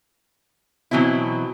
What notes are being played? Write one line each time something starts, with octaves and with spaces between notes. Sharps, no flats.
B2 E3 F#3 C4 E4